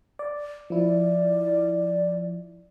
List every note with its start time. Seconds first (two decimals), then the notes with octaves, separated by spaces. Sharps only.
0.19 D5
0.70 F3 E4 D5